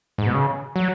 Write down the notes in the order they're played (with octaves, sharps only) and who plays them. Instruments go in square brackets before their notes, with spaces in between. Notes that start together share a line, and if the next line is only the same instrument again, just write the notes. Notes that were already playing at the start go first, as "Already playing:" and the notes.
[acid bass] G#2
B2
C#3
F#3